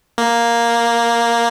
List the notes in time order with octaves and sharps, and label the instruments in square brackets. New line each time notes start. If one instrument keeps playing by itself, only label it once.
[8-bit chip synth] A#3